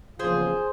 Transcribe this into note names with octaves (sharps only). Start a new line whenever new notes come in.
E2 C#3 F3 A#3 F4 G#4 C5